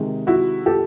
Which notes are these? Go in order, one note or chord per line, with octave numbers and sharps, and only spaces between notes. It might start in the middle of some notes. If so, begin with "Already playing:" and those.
Already playing: C3 D#3 G#3
E4 F#4
G4 A4